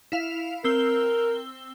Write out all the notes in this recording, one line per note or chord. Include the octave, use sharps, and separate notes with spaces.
E4 F5 F7
C4 A#4 E6 G7